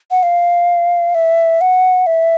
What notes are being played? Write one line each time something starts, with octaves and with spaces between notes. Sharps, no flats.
F#5
F5
E5
F#5
E5